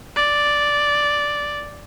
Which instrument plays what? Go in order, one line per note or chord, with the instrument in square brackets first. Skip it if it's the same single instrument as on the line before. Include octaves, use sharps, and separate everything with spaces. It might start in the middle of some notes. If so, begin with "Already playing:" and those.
[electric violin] D5